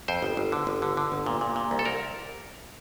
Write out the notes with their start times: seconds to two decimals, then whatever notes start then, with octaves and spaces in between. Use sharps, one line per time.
0.08 F2 C5
0.22 G1
0.37 G1
0.52 D3
0.67 G1
0.82 D3
0.97 D3
1.12 G1
1.26 A#2
1.41 A#2
1.56 A#2
1.71 C2
1.79 A4
1.85 C2 A#4